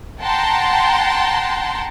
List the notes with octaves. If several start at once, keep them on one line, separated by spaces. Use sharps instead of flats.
F#5 G5 A5 A#5 C6